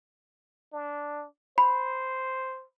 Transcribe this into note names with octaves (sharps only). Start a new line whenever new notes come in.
D4
C5 B5